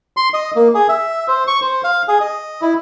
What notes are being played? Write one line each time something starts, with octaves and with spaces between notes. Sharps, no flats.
C6
D#5
A#3
G#4
E5
C5
C#6
C5
F5
G#4
D#5
E4